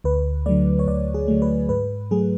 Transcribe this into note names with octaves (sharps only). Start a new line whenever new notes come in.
D2 B4
D3 F#3 A3 D5
C#5
D2 D5
G#4
D3 F#3 A3
B4
G#2 B4
F#3 A3 G#4